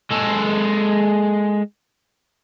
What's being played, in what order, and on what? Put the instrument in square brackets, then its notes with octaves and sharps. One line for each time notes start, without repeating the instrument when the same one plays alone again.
[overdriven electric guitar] G#3 A4